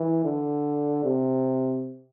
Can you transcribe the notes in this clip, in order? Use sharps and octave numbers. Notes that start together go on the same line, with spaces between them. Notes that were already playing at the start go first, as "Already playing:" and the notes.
Already playing: E3
D3
C3